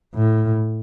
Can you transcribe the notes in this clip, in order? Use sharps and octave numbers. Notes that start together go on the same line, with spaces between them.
A2